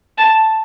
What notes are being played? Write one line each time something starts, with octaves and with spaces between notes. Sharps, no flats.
A5